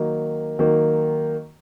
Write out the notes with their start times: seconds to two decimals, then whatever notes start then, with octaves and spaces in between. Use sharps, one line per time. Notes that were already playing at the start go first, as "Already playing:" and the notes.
Already playing: D#3 F#3 A#3 D#4
0.59 D#3 F#3 A#3 D#4